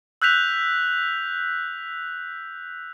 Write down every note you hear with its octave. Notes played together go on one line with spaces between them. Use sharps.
E6 F#6 G6 B6 F7